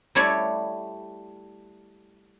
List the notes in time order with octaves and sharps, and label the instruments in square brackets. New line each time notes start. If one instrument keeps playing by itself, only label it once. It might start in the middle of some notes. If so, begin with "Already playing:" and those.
[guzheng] G3 A3 E4 C#5 D5